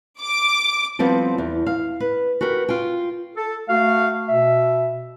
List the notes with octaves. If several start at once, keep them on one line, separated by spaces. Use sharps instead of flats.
D6
F3 G3 B3 C4 A4
E2
F5
B4
F#4 G4 A#4 B4
F4 G5
A4
A3 F#4 F5
B2 E5